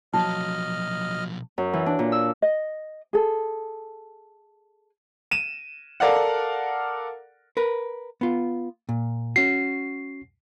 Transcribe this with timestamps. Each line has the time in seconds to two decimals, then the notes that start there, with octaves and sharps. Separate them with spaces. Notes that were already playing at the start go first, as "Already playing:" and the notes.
0.14 B1 F3 F#3 D#5 A5 F6
1.58 F#2
1.73 E3
1.86 D4
1.99 A#2
2.12 E6
2.42 D#5
3.13 G#4 A4
5.31 D#7 E7
6.00 A4 A#4 D5 F5 F#5
7.57 A#4 B4
8.21 B3 F4
8.89 A#2
9.36 C#4 F#4 C7